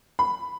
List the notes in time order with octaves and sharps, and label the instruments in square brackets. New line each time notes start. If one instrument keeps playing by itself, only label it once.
[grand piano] B5